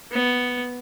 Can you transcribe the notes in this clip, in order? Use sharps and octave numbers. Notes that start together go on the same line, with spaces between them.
B3